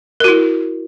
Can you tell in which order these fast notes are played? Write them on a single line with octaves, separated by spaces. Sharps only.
A#4 F#4 E4